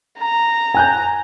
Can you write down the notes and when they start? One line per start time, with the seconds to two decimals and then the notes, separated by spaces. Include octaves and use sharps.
0.19 A#5
0.74 G#5 F#6 G6